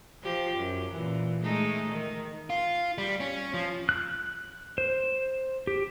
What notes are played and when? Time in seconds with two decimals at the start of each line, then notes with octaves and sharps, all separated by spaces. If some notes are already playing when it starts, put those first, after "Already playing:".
0.22 F3 G4
0.57 F#2
0.92 A#2 E3
1.43 G#3 A3 D#4
1.91 D#3
2.50 F4
2.98 G3
3.20 C#4
3.54 F3
3.89 F#6
4.78 C5
5.67 G4